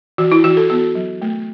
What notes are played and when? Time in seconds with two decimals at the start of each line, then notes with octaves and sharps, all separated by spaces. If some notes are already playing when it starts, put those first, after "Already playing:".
0.18 E3 F#4
0.32 E4
0.44 E3 F#4
0.57 A4
0.70 B3 F#4
0.95 F#3
1.22 A3